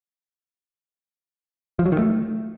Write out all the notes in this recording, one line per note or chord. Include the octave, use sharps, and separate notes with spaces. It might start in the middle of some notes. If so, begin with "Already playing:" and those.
F3
F#3
D#3
A3